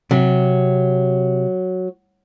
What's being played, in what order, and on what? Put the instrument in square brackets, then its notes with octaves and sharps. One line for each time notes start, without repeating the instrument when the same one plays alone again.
[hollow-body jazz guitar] C3 [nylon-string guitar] F#3